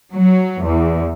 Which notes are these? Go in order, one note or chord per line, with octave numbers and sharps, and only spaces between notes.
F#3
E2